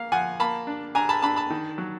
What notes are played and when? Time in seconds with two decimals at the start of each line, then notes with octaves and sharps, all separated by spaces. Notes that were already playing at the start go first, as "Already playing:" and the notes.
Already playing: A#3 F5
0.12 F3 F#5 G#5
0.40 A#3 A5 B5
0.67 D4
0.95 D4 G#5 A#5
1.09 A5 B5
1.22 D4 A5 B5
1.36 A5 B5
1.50 D#3
1.78 F#3